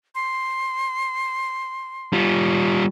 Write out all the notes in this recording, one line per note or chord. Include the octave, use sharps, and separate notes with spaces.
C6
G3 F4